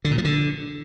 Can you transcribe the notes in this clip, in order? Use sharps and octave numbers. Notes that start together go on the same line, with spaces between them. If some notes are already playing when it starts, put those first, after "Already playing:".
D3
A#2
F3
D3